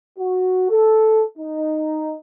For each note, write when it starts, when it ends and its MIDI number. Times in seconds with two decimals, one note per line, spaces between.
0.19 0.67 66
0.70 1.23 69
1.38 2.16 63